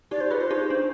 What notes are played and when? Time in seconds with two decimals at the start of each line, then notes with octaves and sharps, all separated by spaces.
0.11 D#4 G4 D5
0.21 C5
0.31 F4 G#4 B4
0.41 C5
0.51 D#4 G4
0.70 D4